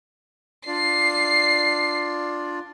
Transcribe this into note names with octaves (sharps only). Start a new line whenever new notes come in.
D4 F4 D5 C7